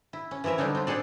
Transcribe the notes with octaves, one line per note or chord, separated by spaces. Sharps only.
E4
C#4
E3 F3 E4 A#4 E5
D3 F#3 G3 D4 D#4 C#5
C4 F4
C4 D4 G#4 A4 D5